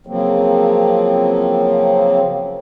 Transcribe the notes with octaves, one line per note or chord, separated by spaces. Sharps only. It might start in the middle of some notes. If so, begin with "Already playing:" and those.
C#3 F3 F#3 A#3 C4